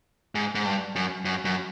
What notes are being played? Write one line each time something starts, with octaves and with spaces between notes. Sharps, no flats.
G#2
G#2
G2
F#2
F#2
F#2